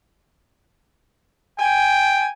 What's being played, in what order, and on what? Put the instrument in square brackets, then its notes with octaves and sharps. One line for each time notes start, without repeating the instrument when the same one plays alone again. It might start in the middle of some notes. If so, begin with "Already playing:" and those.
[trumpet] G5 [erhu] G#5